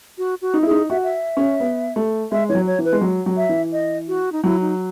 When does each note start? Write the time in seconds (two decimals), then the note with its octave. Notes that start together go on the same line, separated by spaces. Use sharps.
0.18 F#4
0.42 F#4
0.54 D#4
0.63 E4 G#4
0.71 D#4
0.90 F#4 E5
1.04 E5
1.37 C#4
1.60 B3
1.96 A3
2.32 G#3 E5
2.49 E3 C#5
2.55 F#3
2.67 C#5
2.79 E3
2.84 B4
2.93 G#3
3.01 F#3
3.26 F#3
3.37 E5
3.49 E3
3.73 D#5
4.08 F#4
4.32 D#4
4.44 F#3 E4
4.61 D#4